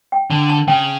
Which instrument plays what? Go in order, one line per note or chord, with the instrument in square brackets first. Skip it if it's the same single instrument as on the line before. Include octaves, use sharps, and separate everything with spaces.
[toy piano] G5
[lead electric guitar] D3 [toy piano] A5
[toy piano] A5
[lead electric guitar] C#3 [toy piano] G5